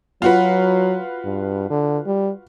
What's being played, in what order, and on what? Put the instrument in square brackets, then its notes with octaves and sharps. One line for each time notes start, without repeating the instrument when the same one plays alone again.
[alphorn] F#3 [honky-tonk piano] F4 F#4 B4
[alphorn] G2
D3
G3